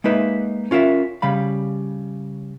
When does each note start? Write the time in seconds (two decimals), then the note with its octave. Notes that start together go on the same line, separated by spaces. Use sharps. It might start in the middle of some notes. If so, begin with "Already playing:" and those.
0.04 G#3 A#3 D#4 B4 E5
0.71 C#4 F4 A#4 E5
1.22 C#3 G3 F5 B5